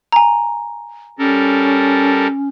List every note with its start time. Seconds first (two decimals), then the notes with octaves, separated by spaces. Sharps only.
0.12 G#5 A#5
1.19 G3 C#4 A4 A#4